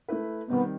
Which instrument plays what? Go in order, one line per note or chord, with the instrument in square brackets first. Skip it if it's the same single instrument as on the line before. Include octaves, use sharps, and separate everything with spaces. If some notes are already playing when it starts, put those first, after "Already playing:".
[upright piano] A3 E4 B4
[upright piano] D#3 G3 C4 D#4 [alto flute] B3